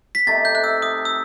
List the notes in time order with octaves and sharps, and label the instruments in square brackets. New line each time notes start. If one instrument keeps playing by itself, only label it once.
[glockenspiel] B6
[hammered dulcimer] C3 D#3 A3 D#4 [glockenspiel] A6
[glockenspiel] G6
F#6
E6
D#6
E6